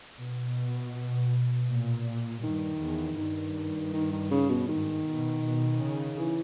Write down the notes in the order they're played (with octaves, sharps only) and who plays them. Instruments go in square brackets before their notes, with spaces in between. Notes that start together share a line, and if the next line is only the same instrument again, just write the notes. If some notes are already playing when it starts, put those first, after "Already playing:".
[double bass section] B2
A#2
[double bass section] G2 [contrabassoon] D#3
[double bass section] E2
[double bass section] G2 [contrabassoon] D#3
[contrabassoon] D#3
D#3
C#3
B2
[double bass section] G#2 [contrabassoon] D#3
[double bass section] B2
B2
C#3
[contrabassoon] E3